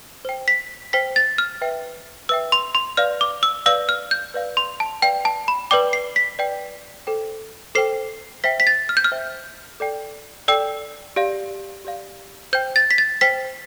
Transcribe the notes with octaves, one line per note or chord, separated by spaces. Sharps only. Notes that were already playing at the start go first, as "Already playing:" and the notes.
C5 G5
B6
C5 G5 B6
A6
F6
B4 E5 G5
B4 E5 G5 E6
C6
C6
B4 D5 F5 F6
D6
E6
B4 D5 F5 E6
F6
G6
B4 D5 F5
C6
A5
B4 D5 F5 G5
A5
B5
B4 D5 G5 D6
C7
B6
B4 D5 G5
A4 C5 G5
A4 C5 G5 C7
C5 E5 G5 B6
B6
A6
F6
G6
F6
C5 E5 G5
A4 D5 G5
A4 D5 G5 E6
G4 D5 F5
G4 D5 F5
C5 G5 G6
A6
B6
A6
C5 G5 B6